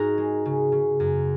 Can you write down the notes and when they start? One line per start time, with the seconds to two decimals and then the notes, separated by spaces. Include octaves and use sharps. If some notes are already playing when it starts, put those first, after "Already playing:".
Already playing: G#2 D#4 F#4 G#4 A#4 D#5
0.18 G#3
0.46 C#3
0.72 C#3
1.00 F#2